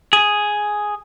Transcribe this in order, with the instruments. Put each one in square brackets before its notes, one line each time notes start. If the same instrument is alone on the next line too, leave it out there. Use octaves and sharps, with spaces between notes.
[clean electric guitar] G#4